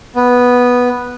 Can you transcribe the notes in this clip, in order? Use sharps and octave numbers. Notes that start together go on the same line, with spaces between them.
B3